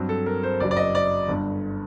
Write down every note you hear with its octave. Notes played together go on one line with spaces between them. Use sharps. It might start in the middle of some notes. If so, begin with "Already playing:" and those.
Already playing: G2 F#3 C4
A4
A#4
C5
F#1 F#2 F#3 D5
D5
D#5
D5
G1 G2 D3